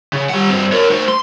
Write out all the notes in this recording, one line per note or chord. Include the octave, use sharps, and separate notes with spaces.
C#3
G3 F#5
G2 C4
A#4 C#5
A3 C5
C6